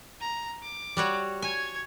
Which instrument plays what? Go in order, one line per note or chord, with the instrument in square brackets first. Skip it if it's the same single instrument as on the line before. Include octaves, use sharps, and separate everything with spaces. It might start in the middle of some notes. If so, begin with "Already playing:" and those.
[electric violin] A#5
D6
[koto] G3 F#4 C#5
[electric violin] C#5 G#6 [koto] G#5